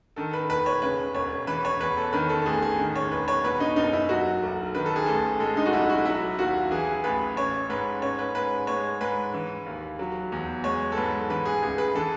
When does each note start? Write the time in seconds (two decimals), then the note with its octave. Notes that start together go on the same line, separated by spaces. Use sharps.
0.16 D#3 A4
0.33 B4
0.50 E1 B4
0.66 C#5
0.82 C#3 B4
1.15 E1 C#5
1.47 E3 B4
1.65 C#5
1.81 E2 B4
1.97 A4
2.13 D#3 B4
2.29 A4
2.42 A4
2.46 A1 G#4
2.62 G#4
2.79 D#3
2.95 C#5
3.11 E1 B4
3.28 C#5
3.44 B2 B4
3.60 D#4
3.76 F#1 D#4
3.93 E4
4.09 F#3 F#4
4.43 B1
4.75 D#3 B4
4.86 A4
4.96 G#4
5.06 A1 A4
5.40 G#3 A4
5.57 D#4
5.66 F#4
5.73 B1 E4
5.89 F#4
6.05 F#3 E4
6.39 D#2 F#4
6.71 E3 G#4
7.04 A1 B4
7.37 C#4 C#5
7.69 G#2 B4
8.02 C#4 C#5
8.19 B4
8.35 G#2 B4
8.67 G#3 C#5
9.01 G#2 B4
9.34 E3
9.66 D#2
9.99 F#3
10.32 E2
10.64 G#3 C#5
10.92 A4
10.97 G#2 B4
11.30 E3 B4
11.45 G#4
11.63 C#2 G#4
11.78 B4
11.95 E3 A4